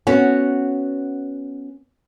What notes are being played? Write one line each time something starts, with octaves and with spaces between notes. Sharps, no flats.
B3 C#4 F#4